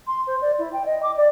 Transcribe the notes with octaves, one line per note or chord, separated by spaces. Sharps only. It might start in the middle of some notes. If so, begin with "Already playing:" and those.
C6
C5
D5
E4
G5
D#5
D6
D5